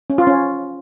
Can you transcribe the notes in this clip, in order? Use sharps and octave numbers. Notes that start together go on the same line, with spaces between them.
C#4
F4
C#4